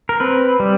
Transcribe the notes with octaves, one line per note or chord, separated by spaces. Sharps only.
A#4
C4 B4
G3